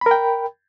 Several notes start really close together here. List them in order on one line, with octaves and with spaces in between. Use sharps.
B5 A#4 G5